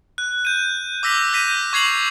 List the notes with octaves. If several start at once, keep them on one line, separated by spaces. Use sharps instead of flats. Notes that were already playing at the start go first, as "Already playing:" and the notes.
F#6
G6 D#7
D6 E6 A#6 B6 F7
G6 A#6 B6 D#7
C#6 G#6 C7 F7 F#7